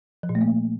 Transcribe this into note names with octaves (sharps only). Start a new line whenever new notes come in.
F3
A#2
A3
A#3